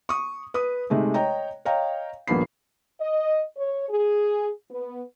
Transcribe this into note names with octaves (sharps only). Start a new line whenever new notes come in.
C#6 D#6
B4 D#6
C3 G#3 A3 D#4
C#5 D#5 G5 A#5
C#5 D#5 F5 G5 A#5
D#1 A#1 A#3 B3 B5 C7
D#5
C#5
G#4
B3